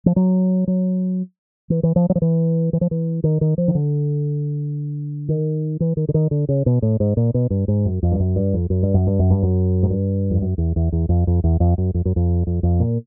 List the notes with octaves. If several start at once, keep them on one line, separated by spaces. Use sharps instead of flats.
F3
F#3
F#3
E3
E3
F3
F#3
F3
E3
E3
F3
E3
D#3
D#3
F3
D#3
D3
D#3
E3
D#3
D3
D#3
D3
C#3
B2
A2
G#2
A#2
B2
G2
G#2
F#2
F2
G2
F#2
G2
F2
F#2
G2
F#2
G2
F#2
G2
F#2
G#2
G2
F2
F#2
E2
E2
E2
F2
F2
E2
F2
F#2
F2
F#2
F2
F2
F2
A#2